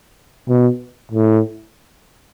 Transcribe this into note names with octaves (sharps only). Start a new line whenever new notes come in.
B2
A2